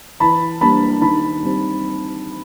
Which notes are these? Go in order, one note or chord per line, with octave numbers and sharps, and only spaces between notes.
E3 A5 B5
G3 A#3 D4 A5 B5
D#3 A5 B5
G3 C4